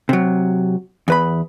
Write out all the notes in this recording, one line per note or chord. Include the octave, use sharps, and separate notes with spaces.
C3 F#3
E2 B4 B5